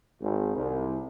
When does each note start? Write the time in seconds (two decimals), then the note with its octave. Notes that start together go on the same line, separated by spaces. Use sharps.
0.20 G#1
0.55 C2